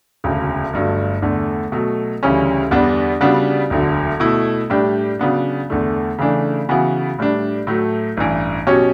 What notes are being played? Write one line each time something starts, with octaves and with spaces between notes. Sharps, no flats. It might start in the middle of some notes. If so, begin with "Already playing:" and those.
E1 D2 C#3
G1 G2 F#3 A3
E2 D3 A3
B2 F#3 A3
D2 C#3 E3 G3 C#4
E2 D3 G3 B3 D4
C#3 G3 B3 D4 F#4
E1 D2 D3 F#3
B2 A3 E4
A2 G3 D4 G4
C#3 F#3 B3 D4
E2 D3 A3
C#3 E3 A3 D4
C#3 E3 B3 F#4
A2 G3 D4
A2 F#3 A3
A1 G2 E3
B2 F#3 C#4 G4 C#5